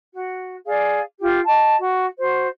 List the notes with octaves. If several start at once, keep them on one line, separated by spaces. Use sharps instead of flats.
F#4
G#4 D5 F5
F4 G4
D#5 A5
F#4
F#4 C5